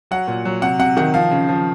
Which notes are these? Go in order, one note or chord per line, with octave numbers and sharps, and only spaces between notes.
F#3 F#5
A#2
F#3
C3 F#5
C3 F#5
D#3 F#5
F3 F5
C#3
F3